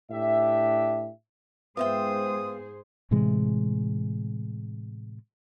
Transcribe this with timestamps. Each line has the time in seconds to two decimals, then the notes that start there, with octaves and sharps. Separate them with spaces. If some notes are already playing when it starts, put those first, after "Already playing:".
0.11 A2 D4 G4 E5
1.77 G#2 B3 F4 G#4 C5 E5 G5 D#6
3.11 A2 C3 E3 G#3